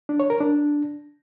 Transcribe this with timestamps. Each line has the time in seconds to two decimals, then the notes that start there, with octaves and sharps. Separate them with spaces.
0.09 D4
0.20 C#5
0.30 A#4
0.40 D4